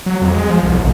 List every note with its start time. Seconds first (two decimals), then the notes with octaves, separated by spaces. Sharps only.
0.06 F#3
0.21 F2
0.34 G#3
0.50 F3
0.63 C2
0.78 A1